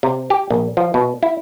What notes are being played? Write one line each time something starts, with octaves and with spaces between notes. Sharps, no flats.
C3
G4
A#1
F3
B2
E4